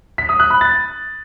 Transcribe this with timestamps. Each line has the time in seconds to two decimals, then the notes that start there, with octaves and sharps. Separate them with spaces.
0.18 B6
0.29 D#6
0.40 F#6
0.50 B5
0.61 A6